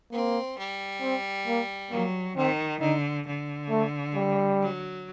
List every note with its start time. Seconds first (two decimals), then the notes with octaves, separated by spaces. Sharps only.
0.12 A#3 C4
0.57 G3
1.01 C4
1.47 A#3
1.91 F#3 A#3
2.36 D#3 C4
2.80 D3 D#4
3.26 D3
3.70 A3
4.15 G3
4.61 F#3